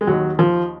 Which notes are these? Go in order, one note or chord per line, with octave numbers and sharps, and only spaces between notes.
G#3
D#2 D#3 F#3
F3